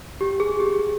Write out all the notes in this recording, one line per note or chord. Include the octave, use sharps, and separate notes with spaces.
G4
G#4
G4